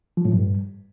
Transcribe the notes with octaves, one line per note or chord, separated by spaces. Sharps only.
F3
A2
G2